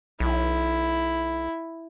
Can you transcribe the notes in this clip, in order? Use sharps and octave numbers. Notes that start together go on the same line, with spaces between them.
B1 E4